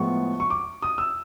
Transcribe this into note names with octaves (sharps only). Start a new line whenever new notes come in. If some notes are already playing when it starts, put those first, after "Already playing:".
Already playing: A2 F3 G#3 B3 C#6
C#6
D6
D#6
E6